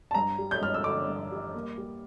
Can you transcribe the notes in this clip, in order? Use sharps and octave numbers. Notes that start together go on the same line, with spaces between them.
A5
G2 A#5
G3
G6
G2 F6
E6
D3 D6
G2
G3
A#3
G3